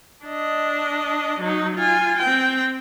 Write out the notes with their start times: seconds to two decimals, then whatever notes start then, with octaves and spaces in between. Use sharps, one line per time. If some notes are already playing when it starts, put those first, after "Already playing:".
0.25 D4 D#5
1.40 F#3 D#4
1.76 F4 G#5
2.19 C4 G5